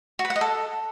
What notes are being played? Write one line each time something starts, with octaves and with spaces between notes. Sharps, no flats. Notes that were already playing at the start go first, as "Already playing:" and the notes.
F#4
B4
F#5
D#5
A4